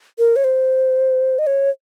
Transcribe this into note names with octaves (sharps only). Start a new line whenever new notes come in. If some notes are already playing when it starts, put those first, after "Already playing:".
A#4
C#5
C5
D#5
C#5